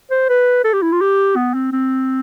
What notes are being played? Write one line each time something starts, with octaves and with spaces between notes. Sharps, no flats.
C5
B4
A4
G4
E4
F4
G4
B3
C4
C4